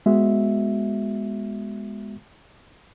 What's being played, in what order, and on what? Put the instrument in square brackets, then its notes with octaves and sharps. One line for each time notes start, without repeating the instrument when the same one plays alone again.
[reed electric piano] G#3 B3 F#4 E5